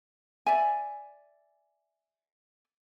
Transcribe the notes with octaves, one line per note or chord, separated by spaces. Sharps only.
D5 E5 G#5